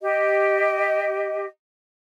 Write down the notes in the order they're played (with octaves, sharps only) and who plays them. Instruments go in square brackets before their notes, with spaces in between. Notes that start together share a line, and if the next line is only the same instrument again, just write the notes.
[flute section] G4 D#5